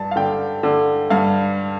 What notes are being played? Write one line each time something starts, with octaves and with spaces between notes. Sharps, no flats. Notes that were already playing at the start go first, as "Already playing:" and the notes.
Already playing: G2 A5
F5
D3 G5
D3
G2 F5